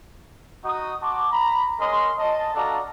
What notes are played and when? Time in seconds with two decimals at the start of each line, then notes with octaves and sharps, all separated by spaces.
0.64 D#4 F#4 D#6
1.02 F#4 A5 C6 D6
1.32 A#5 B5
1.80 G#3 C#4 A#4 D#5 C6
2.19 D#5 A5
2.55 D4 F#4 A4 D5 F5 A#5